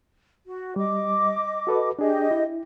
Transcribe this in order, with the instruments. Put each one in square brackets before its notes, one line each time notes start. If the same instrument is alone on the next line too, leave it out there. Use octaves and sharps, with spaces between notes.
[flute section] F#4
[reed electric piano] G3 [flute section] D#5 D6
[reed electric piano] F#4 A4 B4
[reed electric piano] D4 G#4 [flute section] G4 D#5
[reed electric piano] E4